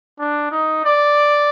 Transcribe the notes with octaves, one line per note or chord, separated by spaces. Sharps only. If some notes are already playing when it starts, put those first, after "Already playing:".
D4
D#4
D5